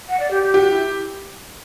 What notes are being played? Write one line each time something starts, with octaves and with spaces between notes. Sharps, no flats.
F#5
D5
G4
G4
F#4 G4
E4